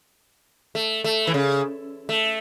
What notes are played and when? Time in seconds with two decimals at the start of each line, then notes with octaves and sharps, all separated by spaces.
0.75 A3
1.04 A3
1.27 E3
1.34 C#3
2.09 A3